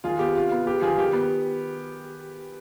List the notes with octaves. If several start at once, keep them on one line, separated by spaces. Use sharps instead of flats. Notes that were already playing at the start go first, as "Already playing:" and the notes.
D#3 F4 G#4
B3 G4
C3 F4
B3
B3 G4
D#3 F4 G#4
D#3 G4
B3